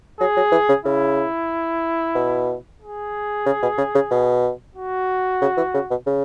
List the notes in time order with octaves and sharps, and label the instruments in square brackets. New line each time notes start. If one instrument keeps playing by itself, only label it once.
[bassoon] F#3 [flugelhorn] G#4
[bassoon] F#3
E3
C#3
[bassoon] C#3 [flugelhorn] E4
[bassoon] B2
[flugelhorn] G#4
[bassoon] C#3
B2
C#3
C#3
B2
[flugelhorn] F#4
[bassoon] C#3
E3
C#3
B2
C#3